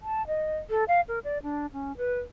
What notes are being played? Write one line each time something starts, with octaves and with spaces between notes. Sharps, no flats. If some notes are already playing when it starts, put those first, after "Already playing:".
A5
D#5
A4
F5
A#4
D5
D4
C#4
B4